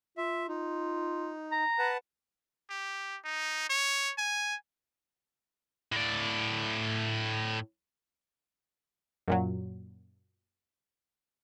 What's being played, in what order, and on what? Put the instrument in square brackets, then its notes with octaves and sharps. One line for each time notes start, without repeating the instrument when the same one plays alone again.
[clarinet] F4 [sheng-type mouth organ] E5
[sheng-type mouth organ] D#4 [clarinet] F4
[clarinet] A#5
[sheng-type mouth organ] B4 F#5 A5
[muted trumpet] G4
D#4
C#5
G#5
[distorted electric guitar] A2 D5
[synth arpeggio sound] F#2 A#2 F#3